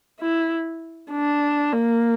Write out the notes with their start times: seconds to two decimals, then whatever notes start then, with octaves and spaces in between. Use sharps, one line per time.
0.20 E4
1.12 D4
1.72 A#3